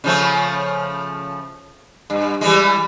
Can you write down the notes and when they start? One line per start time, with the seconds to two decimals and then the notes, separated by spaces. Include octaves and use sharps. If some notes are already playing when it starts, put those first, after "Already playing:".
0.04 C#3 F3 A3
2.10 G2
2.41 E3 G3 G#3